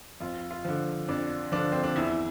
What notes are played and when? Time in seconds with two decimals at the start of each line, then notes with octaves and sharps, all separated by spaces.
0.20 F2 F4
0.51 F4
0.65 D3 F3
1.08 F2 D4
1.52 D3 F3 D4
1.72 C4
1.84 D4
1.96 E2 E4